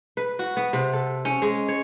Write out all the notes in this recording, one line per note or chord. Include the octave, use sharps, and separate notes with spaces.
B4
F#4
B3
C3
A4
C#4
G#3
C#5